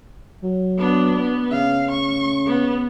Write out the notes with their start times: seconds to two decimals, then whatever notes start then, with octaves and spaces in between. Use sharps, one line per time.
0.43 F#3
0.78 B3 D4
1.19 B3
1.52 C#3 F5
1.91 C#6
2.46 B3